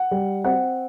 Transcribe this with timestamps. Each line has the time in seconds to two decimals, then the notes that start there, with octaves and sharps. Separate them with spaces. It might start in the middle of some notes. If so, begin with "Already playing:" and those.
Already playing: F#5
0.11 G3
0.44 C4 F#5